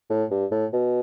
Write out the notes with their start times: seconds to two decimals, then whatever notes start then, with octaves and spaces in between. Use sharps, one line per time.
0.10 A2
0.31 G2
0.51 A2
0.73 B2